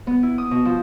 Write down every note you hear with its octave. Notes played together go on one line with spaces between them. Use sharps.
B3
E4
D#6
B2
F3